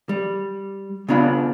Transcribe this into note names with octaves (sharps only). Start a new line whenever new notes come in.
G3
C#3 B3 D4 F4 B5